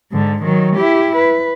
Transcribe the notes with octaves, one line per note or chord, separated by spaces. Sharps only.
G#2 D3
D#3 F#3
E4 G4
B4